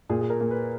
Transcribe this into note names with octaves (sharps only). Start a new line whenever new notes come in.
A#2 G#4
G#4
A#4
A#3
B4